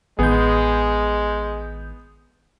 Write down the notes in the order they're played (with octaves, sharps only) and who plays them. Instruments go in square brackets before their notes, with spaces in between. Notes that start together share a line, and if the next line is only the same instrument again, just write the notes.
[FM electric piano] A1 D#3 G6 [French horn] G#3 [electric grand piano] B3 G#4